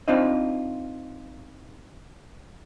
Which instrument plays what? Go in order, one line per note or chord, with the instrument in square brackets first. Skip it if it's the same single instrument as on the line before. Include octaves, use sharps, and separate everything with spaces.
[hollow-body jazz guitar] C4 D4 D#4 F4 C5 D#5